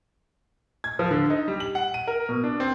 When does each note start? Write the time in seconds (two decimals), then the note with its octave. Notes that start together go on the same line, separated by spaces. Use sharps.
0.84 G#6
0.99 F3
1.11 D3
1.30 D#4
1.48 G3
1.60 F#7
1.75 F#5
1.94 D#7
2.07 A#4
2.29 B2
2.44 D4
2.60 C4